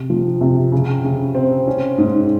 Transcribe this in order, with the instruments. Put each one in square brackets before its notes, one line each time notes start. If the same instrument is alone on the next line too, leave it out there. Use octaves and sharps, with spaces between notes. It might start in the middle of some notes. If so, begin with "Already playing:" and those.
Already playing: [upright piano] C3
F3
C3
C#3
C#3
C4
C#4
G#2